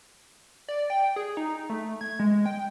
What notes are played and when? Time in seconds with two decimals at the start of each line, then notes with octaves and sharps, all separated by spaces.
0.68 D5
0.90 G5
1.16 G#4
1.37 D#4
1.69 A3
2.01 G#6
2.19 G#3
2.46 G5